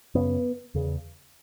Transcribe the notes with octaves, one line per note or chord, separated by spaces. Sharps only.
F#2 C#3 B3
E2 C#3